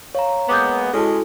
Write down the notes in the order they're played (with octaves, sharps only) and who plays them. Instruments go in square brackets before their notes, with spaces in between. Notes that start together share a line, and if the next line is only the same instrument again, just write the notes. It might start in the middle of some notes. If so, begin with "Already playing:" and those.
[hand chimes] C#5 A#5 [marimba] F5
[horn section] G#3 A#3 B3 [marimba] D6 D#6 G6
[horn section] G#3 C#4 [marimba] E4 F#4 A5 [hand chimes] A4